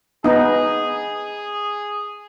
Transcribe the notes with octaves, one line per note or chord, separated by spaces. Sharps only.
B3 D#4 G#4